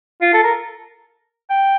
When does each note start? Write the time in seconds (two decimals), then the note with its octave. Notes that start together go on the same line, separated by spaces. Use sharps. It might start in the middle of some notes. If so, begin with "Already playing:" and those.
0.21 F4
0.33 A4
0.44 A#4
1.50 G5